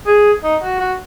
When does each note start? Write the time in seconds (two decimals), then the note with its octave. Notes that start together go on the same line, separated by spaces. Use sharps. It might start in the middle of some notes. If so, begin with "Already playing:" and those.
0.07 G#4
0.43 D#4
0.62 F#4
0.80 F#4